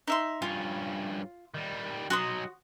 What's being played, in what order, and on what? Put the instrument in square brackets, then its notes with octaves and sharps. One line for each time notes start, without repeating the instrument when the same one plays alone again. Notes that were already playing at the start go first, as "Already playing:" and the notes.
[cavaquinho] D#4 E5 C6
[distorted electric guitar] G2 C#4 [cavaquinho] F4
[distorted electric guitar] D#3 G3
[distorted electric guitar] F#3 D#4 [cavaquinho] F#4 C6 D#6